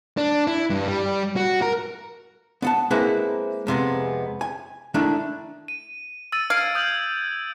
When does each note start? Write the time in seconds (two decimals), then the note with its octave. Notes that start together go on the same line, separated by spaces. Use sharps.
0.17 D4
0.47 E4
0.70 G2
0.88 G3
1.36 F#4
1.62 A#4
2.62 B3 F#5 A5
2.91 G#3 A#3 C4 E4 B4 F#5
3.67 F2 C3 G#3 B3
4.41 G#5
4.94 D#3 A3 D4 E4
5.68 D#7
6.32 E6 A6 D#7
6.50 F5 G#6 D7
6.75 D#6 G6 F#7